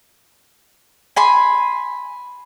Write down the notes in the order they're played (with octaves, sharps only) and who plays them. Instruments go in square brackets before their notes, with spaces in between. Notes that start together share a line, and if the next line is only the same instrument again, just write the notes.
[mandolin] G#5 B5 C6